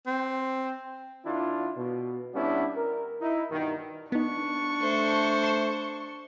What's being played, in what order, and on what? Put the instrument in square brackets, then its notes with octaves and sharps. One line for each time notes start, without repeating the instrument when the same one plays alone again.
[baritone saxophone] C4
[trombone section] D#3 D4 E4 F4
B2
G3 B3 C#4 D4 E4
A#4
D#4 E4
G2 B2 D#3
[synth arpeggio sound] B3 D#4 [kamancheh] D4 C#6
[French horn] A3 [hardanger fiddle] C5
[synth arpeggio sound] C7 E7